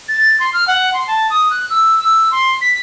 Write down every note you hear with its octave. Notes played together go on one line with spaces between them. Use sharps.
A6
C6
F6
F#5
C6
A5
D#6
F#6
E6
E6
C6
B6